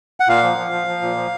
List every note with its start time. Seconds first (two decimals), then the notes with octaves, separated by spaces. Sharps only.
0.20 F#5
0.28 A#2 F5
0.43 F3
0.58 F3
0.72 F3
0.87 F3
1.02 A#2
1.17 F3